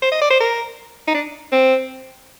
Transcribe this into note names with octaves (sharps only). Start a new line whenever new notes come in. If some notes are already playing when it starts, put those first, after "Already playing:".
C5
D#5
D5
C5
A#4
D#4
D4
C4